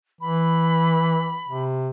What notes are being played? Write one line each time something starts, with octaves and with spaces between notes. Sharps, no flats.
E3 B5
C3